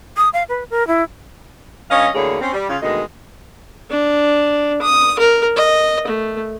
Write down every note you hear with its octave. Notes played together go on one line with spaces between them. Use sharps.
D#6
F5
B4
A#4
E4
G2 C#4 C#5 D#5 F5
D2 A2 D3 A#3 G#4 C#5
C4 C#4
G3
C#3 F4
D2 B2 D#3 G#3 D#5
D4
D#6
A#4
D#5
A3